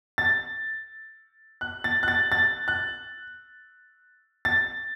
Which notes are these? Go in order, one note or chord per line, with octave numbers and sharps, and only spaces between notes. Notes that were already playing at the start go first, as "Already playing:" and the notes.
A6
F#6
A6
F#6
A6
A6
F#6
A6